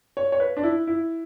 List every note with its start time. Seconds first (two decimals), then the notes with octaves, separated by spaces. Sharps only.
0.17 C#5
0.32 C#5
0.40 B4
0.57 D4
0.63 E4
0.87 E4